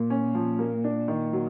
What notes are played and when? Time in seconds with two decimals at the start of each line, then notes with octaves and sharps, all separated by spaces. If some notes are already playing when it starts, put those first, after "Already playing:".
Already playing: A#2 A#3
0.10 C#4
0.35 F3
0.59 A#3
0.84 D4
1.08 D#3
1.33 F#3